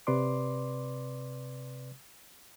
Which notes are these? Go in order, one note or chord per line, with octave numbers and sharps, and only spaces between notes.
C3 B4 D5 C6 D6